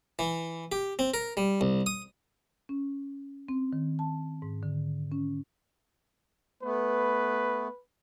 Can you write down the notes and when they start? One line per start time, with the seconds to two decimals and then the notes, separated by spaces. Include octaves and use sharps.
0.19 E3
0.72 G4
0.99 C4
1.14 A#4
1.37 G3
1.61 C2
1.86 D#6
2.69 C#4
3.49 C4
3.73 D#3
3.99 A5
4.42 G#2
4.63 D3
5.12 C#4
6.63 A3 B3 B4